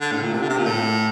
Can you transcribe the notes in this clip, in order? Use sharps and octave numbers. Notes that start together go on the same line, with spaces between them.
D3
A2
A#2
C3
D3
C3
A#2
A2